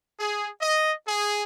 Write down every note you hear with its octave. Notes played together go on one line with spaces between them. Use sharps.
G#4
D#5
G#4